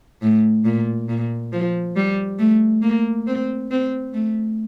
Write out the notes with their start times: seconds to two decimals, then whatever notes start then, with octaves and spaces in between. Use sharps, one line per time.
0.22 A2
0.65 A#2
1.08 A#2
1.52 F3
1.96 G3
2.39 A3
2.82 A#3
3.27 C4
3.71 C4
4.14 A3